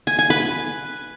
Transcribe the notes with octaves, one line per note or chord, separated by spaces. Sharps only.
G#5
G#5
B4